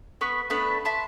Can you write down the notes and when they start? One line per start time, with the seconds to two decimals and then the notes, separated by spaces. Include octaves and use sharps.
0.21 B3 B4 C#6
0.50 A3 B3 D4 B4
0.85 E5 A5 C6